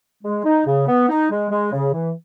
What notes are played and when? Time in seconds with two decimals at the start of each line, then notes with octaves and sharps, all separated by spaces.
0.23 G#3
0.45 D#4
0.66 C#3
0.88 B3
1.09 D#4
1.31 G#3
1.51 G#3
1.73 C#3
1.93 E3